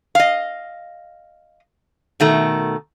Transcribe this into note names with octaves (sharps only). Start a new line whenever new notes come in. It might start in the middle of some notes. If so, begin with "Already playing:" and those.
D#5 F5
B2 D#3 A3